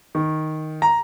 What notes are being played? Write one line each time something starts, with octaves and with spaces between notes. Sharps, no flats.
D#3
A#5